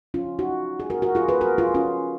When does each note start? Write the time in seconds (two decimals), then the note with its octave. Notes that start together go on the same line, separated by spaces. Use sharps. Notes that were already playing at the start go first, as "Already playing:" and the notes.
0.14 C#4 F4
0.39 D#4 F#4
0.80 G#4
0.90 F#4 A#4
1.02 F#4 A#4
1.15 F4 G#4
1.28 G#4 B4
1.41 F#4 A#4
1.58 F4 G#4
1.75 C#4 F4